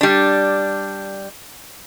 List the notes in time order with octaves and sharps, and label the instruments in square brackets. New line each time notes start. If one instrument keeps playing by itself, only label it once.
[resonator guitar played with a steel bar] G3 D4